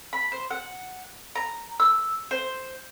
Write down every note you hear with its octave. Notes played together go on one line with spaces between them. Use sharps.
B5
C5
F#5
A#5
E6
C5